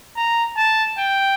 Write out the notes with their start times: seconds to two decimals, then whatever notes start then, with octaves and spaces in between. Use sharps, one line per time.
0.16 A#5
0.57 A5
0.98 G5